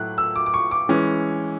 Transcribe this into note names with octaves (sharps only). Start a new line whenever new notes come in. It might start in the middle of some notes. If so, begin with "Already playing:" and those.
Already playing: A2 F#3 A3 E4 F#6
E6
D6
D6
C#6
D6
E3 G#3 C#4